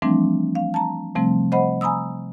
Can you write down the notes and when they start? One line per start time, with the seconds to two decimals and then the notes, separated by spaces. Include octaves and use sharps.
0.02 E3 F3 G3 A3 C4 D4
0.55 F5
0.74 A5 A#5
1.15 C3 F3 G3 A3 C4
1.52 C5 D#5 F#5 B5
1.81 G#5 A#5 B5 D#6 E6